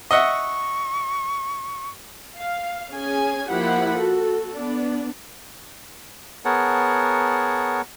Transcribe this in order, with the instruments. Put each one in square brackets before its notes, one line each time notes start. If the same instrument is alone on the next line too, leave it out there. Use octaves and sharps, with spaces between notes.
[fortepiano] D#5 E5 F#5 [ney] C#6
[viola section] F5
C#4 G#4 G#5
F3 A#3 E4 G4 F#5 B5
F#4 A4
B3 D4
[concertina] B3 G#4 A#4 C#5 F#5 A5